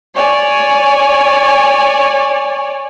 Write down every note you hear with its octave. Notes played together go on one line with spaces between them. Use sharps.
C#5 D5 G#5